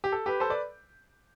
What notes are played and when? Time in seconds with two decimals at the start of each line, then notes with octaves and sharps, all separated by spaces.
0.04 G4
0.12 A4
0.26 G4 B4
0.40 A4 C5
0.50 B4 D5